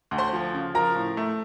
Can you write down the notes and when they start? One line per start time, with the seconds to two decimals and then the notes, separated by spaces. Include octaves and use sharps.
0.11 D2
0.18 C5 C6
0.33 F3
0.54 C#3
0.74 F3 A#4 A#5
0.96 A2
1.17 A3